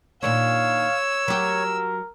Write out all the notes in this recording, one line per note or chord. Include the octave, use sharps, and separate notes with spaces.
A#2 D#3 D4 C#5 F5 E6
F#3 G4 A#4